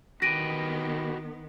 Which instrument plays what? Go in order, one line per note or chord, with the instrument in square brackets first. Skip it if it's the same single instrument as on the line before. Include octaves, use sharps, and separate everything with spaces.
[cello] D#3 B3 [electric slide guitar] F#4 G4 B4 [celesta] A#6 D7 D#7